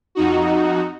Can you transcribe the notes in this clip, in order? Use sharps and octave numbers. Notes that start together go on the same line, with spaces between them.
F2 D#4 F#4